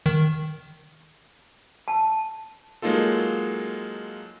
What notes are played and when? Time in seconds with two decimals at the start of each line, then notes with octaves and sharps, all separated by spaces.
0.06 D#3
1.88 A5
2.82 F#3 G#3 A#3 D#4 F4 A4